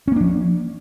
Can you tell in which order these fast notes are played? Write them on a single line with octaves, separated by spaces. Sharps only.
C#4 A#3 D4 F3